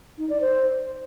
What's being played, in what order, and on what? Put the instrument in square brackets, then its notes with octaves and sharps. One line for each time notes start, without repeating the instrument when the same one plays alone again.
[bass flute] D#4
D5
C5